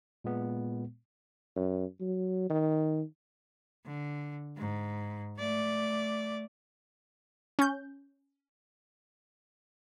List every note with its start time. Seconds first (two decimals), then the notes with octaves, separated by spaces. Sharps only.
0.24 A#2 G#3 B3
1.57 F#2
2.01 F#3
2.50 D#3
3.86 D3
4.58 G#2
5.38 A3 D5
7.59 C#4 G6